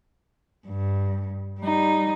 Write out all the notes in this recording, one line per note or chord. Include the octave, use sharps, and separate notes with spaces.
G2
G3 D#4